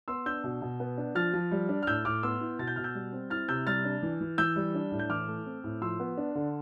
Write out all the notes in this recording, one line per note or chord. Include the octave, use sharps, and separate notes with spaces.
B3 C6 E6
D4 E6 G6
B2
B2
B3
D4
F3 F6 A6
F3
G3
D4
F6
A2 E6 G6
A2 D6 F6
B3 C6 E6
E4
B2 A6
G6
B2 F6
E6 G6
G3
C4
E4 F6 A6
C3 E6 G6
G3 F6 A6
D4
E3
E3
E3 E6 G6
G3
D4
A2
G6
E3 D6 F6
A3
C4
A2
F3 C6 E6
B3
D4
D3